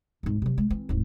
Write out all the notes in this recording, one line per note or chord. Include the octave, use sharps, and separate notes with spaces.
D1 G#2
C3 F#3
G#3
E3 C4
D1 G#2